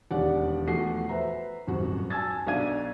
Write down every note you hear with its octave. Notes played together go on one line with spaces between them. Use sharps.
E1 D#2 G4 D5 F#5
E2 F3 A3 F#4 F#5 C7
B4 C5 E5 A#5
D#1 G#1 F#2 F#4
G#5 A5 E6 G#6 A6
B1 F#3 D4 F5 G#6 D#7